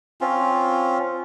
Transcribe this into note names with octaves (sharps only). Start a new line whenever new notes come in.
C4 C#4 F4